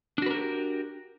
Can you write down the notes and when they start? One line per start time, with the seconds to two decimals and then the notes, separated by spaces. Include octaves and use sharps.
0.18 D4
0.22 F#4
0.26 B4
0.30 A#4
0.35 G4